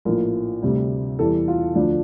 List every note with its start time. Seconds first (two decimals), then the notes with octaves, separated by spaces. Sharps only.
0.05 A#1 A2 F3 A#4
0.63 D2 C3 G3
1.19 E2 E3 G3 A4
1.48 F4
1.75 D2 D3 F3 D4